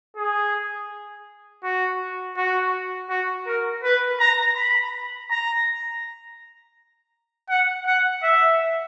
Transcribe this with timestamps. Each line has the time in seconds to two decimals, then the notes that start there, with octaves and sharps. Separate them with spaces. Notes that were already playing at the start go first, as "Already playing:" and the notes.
0.17 G#4
1.63 F#4
2.37 F#4
3.10 F#4
3.47 A#4
3.84 B4
4.20 A#5
4.57 B5
5.30 A#5
7.50 F#5
7.87 F#5
8.23 E5